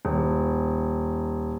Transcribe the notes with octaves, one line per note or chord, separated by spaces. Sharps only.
D#1